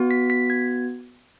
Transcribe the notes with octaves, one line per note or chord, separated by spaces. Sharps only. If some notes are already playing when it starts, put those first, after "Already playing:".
Already playing: B3 F#4
B6
B6
G#6